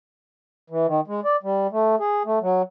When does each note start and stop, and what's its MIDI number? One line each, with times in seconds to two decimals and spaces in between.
0.70 0.87 52
0.87 1.01 51
1.08 1.20 56
1.25 1.36 74
1.43 1.67 55
1.71 1.95 57
2.00 2.23 68
2.25 2.39 57
2.41 2.62 54